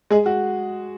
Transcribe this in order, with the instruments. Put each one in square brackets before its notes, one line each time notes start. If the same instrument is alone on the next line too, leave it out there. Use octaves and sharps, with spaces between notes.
[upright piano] G#3 G#4
F#4